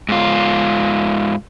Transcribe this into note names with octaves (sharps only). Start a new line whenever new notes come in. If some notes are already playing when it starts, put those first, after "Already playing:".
G#2 F4